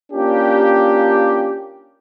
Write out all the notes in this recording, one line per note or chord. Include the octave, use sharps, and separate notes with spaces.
A#3 C#4 D4 F4 G4